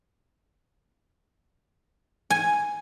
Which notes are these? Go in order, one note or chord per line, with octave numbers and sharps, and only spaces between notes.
G#5